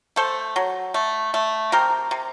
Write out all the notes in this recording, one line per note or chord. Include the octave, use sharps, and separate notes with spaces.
A3 A4 C5
F#3
A3
A3
C3 G4 A#4
C3